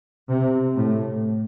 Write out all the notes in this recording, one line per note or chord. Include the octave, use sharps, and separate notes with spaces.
C3
A2